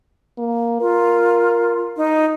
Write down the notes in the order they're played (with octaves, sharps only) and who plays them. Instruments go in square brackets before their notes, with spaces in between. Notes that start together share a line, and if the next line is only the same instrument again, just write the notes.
[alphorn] A#3
[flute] F4 [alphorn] A#4
[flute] D#4